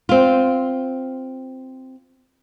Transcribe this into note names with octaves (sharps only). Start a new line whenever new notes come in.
C4 F4